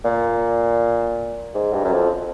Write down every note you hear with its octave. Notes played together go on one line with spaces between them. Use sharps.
A#2
G#2
G2
F#2
F2